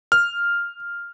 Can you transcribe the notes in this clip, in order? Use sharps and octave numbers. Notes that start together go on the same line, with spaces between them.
F6